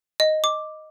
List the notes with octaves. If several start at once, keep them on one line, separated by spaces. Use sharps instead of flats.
D#5
D6